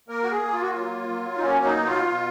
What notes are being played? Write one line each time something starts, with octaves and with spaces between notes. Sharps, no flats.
A#3 A#4
F#4
G#4
A#3
F4
F#4
F#3 F4
F#3
D#4
A#3 C#4
D#4
B2
F4
B2